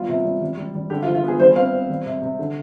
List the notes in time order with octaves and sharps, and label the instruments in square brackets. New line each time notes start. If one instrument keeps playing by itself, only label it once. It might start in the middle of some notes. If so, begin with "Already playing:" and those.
Already playing: [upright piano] G3 B3 F4
C3
G3
G3
G3
G3
D3 G4
F4
F3
F4
B3 G#4
G3 C5
C4 F5
C4
G3
C3
C3
D3